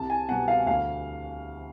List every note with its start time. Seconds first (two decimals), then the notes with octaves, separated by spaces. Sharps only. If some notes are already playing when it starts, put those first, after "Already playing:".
Already playing: C2 A5
0.10 G#5
0.28 B2 G3 F#5
0.48 F5
0.67 D2 F5